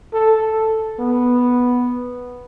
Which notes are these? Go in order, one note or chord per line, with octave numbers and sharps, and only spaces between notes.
A4
B3